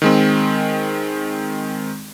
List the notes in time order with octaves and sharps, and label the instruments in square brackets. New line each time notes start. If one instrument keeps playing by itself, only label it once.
[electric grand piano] D#3 G#3 C4